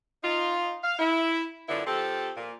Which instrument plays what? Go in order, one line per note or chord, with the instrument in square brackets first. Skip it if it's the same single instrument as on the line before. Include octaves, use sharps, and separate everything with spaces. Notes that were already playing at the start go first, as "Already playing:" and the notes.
[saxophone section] D#4 F4
F5
E4
F#2 D3 B3 E4 F4
F3 C4 G4 A4
A#2